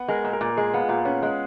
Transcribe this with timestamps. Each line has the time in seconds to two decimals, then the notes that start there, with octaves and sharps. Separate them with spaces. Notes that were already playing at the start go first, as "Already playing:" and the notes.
Already playing: B3 B4
0.08 G#3 A#4
0.24 A#2
0.33 A#4
0.41 A#2
0.56 G#3 G#4
0.73 B3 F4
0.89 A#2 F4
1.05 B3 C#4
1.22 G#3